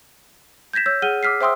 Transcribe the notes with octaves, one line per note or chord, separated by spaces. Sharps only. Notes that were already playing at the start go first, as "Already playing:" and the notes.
G6 G#6 A#6 B6 E7
C#5 E6 G6
G#4 F#5 F6 D#7 G7
D6 E6 F6 B6 C7
C5 E5 G5 C6 D#6 E6